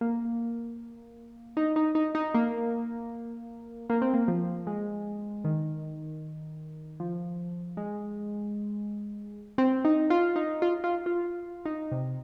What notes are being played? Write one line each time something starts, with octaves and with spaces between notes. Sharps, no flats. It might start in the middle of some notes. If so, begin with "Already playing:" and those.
A#3
D#4
D#4
D#4
D#4
A#3
A#3
C4
A#3
F3
G#3
D#3
F3
G#3
C4
D#4
F4
D#4
F4
F4
F4
D#4
C3